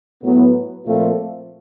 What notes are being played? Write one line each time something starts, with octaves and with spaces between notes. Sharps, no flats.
A2 F#3 B3
A#2 F3 A3 C4 F4